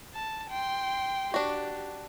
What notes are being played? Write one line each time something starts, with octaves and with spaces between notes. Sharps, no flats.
A5
G5 C6
D4 F#4 G4